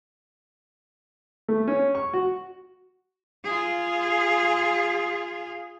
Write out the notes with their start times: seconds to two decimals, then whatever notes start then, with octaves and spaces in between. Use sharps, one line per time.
1.48 A3
1.68 C#4
1.95 C#6
2.14 F#4
3.44 F4 G#4